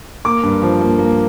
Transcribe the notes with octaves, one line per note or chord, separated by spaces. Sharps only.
A#3 D6
G2
F3
A#3
A#3